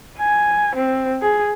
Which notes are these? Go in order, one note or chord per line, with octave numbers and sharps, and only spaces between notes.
G#5
C4
G#4